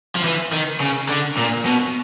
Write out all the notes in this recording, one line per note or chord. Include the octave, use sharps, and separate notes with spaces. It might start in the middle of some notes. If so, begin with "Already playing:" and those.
F3
E3
D#3
C#3
D3
A#2
B2